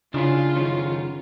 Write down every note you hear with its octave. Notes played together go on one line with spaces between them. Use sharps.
C#3 D4 E4 F4 G#4
F#2 D#3 C#4